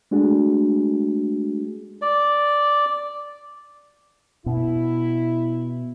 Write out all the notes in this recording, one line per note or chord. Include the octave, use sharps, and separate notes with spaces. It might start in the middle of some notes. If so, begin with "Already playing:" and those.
G#3 A3 D4 F#4 G#4
D5
B2 E4